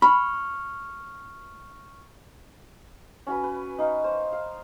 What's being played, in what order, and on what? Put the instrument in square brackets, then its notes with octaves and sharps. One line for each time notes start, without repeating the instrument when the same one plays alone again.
[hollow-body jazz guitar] B5 [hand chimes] C#6 F6
[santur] C#4 F#4 B4
B4
D#4 F5
C5
F5